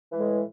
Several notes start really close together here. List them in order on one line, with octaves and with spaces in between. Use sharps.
E3 G#3 A2